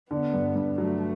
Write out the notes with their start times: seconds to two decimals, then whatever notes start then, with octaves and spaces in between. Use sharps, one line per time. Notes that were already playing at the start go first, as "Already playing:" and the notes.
0.11 D3 B3
0.33 G2
0.56 G2
0.78 F#3 A3